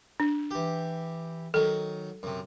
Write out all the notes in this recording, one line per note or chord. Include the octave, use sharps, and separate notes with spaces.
D4
E3 G4
D#3 F#3 A4
F#2 C3